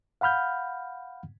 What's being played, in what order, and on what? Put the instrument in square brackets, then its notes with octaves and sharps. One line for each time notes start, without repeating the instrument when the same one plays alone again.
[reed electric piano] F5 F#5 B5 F6 G6